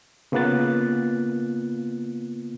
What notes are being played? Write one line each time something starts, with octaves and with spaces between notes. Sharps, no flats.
C#3 A#3 B3 F4 F#6 A6